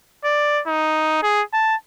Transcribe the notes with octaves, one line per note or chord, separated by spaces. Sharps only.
D5
D#4
G#4
A5